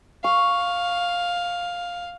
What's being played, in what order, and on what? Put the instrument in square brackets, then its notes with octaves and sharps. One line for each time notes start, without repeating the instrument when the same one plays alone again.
[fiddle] F5 [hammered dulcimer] C#6